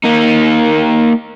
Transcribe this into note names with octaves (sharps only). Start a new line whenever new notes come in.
A#3 D#4